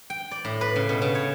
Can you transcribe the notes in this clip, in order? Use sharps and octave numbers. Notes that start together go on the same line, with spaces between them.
G5
D5
A2
B4
C#3
B2
C#3
C#5